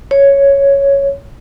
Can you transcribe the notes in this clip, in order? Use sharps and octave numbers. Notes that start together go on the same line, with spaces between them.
C#5